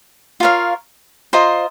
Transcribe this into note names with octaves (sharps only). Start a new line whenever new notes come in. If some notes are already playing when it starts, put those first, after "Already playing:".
F4 A#4 C#5 F5
F4 C5 D#5 A#5